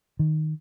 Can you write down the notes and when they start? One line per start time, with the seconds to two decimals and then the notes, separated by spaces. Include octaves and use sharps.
0.19 D#3